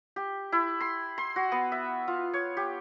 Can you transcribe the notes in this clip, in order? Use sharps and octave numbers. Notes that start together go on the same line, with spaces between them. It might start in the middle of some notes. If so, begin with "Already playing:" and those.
G4
E4
C6
C6
F#4
B3
E5
F4
C#5
G4